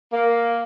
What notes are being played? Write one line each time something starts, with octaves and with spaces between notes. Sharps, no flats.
A#3